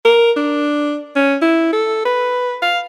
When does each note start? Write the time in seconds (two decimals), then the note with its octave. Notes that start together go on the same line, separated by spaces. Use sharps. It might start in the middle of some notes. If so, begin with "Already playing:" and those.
0.05 A#4
0.36 D4
1.16 C#4
1.42 E4
1.73 A4
2.05 B4
2.62 F5